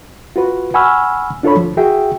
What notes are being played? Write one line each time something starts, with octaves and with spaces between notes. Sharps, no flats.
F4 F#4 B4
F#5 G#5 B5 C#6 E6 F6
D4 F4 A4 C#5 B5
D2 F3
F#4 G#4 E5 G5